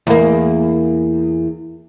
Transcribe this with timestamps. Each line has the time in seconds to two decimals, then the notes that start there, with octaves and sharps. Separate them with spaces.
0.07 E2 A#3